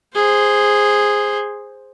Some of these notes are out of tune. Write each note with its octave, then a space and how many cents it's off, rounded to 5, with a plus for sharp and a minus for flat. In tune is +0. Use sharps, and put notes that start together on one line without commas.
G#4 -10 C5 +0